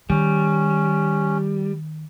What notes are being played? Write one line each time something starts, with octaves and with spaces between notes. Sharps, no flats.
D#3 G3 C#4